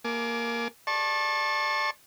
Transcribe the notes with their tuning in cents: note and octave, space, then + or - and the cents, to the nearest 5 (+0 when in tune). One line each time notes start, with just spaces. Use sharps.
A#3 +0 G#5 +35 D6 +0
D5 +15 A5 +0 C#6 -35